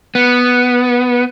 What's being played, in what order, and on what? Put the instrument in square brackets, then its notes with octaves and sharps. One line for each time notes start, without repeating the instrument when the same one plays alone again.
[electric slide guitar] B3